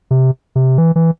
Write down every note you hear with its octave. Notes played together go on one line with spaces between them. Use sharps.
C3
C3
E3
E3